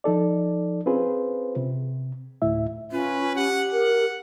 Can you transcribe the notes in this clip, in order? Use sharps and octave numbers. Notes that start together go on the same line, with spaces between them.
F3 D#4 A4 D5
C4 C#4 F4 G#4 B4 C5
C3
D2 A2 E4 E5
C#4 F4 B4
G4 F#5
A#4 F#5